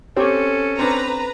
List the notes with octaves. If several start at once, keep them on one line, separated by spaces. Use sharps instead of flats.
C4 C#4 G4 A4 C#5
C4 D4 B4 A#5